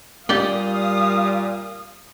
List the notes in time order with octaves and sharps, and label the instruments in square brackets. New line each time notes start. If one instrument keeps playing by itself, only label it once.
[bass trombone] A#2 [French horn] G3 [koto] G4 D5 G5 [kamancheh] F5 D#6